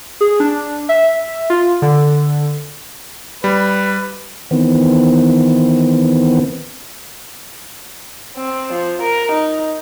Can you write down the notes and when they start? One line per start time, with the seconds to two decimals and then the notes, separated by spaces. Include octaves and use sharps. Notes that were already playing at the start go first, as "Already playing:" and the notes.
0.21 G#4
0.40 D4
0.89 E5
1.50 F4
1.82 D3
3.44 G3 B4
4.51 D#3 E3 B3 C4
8.37 C4
8.73 F3
9.02 A#4
9.32 D#4